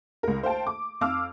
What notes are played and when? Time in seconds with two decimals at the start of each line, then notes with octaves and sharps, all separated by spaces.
0.23 C#2 A#4
0.43 C5 F5 G5 A5
0.67 D6
1.01 F2 F5 D6 E6 F6